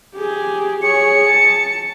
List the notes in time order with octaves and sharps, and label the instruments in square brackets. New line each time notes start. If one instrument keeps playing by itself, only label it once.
[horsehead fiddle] G4 G#4
[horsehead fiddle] G#4 C#5 [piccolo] C#7
[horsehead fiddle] A5